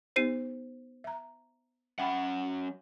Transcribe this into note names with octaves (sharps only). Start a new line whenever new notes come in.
B3 D#4 G4 C5 C7 D#7
E5 A#5
F#3 C#4 E5 F#5 G5 B5